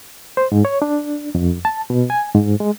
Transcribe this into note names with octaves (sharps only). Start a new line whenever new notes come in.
C5
G#2
C#5
D4
F2
A5
B2
G#5
G#2
G#3